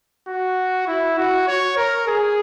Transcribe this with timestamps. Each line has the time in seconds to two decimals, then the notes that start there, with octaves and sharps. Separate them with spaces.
0.28 F#4
0.88 E4
1.18 F#4
1.48 C#5
1.77 A#4
2.08 G#4